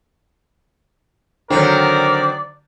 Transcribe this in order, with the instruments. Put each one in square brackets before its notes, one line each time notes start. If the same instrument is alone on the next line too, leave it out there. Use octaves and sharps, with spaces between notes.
[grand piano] D3 F#3 [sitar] D#3 C4 [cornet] A#4 [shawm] D5